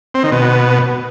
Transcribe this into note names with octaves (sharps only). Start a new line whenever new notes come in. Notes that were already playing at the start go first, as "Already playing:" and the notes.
C4
D#3
B2